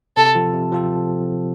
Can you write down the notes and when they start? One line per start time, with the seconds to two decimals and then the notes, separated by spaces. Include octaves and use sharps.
0.17 C3 A4
0.35 F3 C4 F4 A4
0.53 C3
0.72 F3 C4 F4 A4